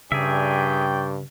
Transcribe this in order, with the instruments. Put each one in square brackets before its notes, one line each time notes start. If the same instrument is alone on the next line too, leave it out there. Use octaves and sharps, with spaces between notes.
[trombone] G2 [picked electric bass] C#3 [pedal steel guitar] G#4 A#4 E5 [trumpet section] C#5 D5 G5